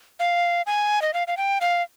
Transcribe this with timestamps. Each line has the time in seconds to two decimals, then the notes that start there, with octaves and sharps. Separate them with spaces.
0.20 F5
0.67 G#5
1.02 D#5
1.14 F5
1.27 F5
1.37 G5
1.61 F5